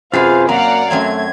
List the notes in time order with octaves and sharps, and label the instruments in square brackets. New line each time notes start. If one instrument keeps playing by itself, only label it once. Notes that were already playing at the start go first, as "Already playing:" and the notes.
[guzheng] F#2 C3 [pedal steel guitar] F4 G#4 B4 [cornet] C5 [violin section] F5
[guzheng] F#3 [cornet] A#3 [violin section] D5 F5 F#5 [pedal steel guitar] A#5
[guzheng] F#2 F#3 C4 [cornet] A3 [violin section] G#6